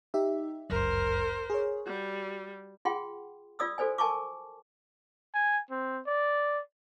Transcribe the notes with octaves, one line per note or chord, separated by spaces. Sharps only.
D#4 G4 E5
G1 C#2 F#2 A#4 C5
G#4 C#5
G3 F#4
F4 G#4 F#5 G5 C6
F4 D5 D#6 E6
F#4 A4 C5 D5 G#5
A#4 G#5 A5 C#6 D6
G#5
C4
D5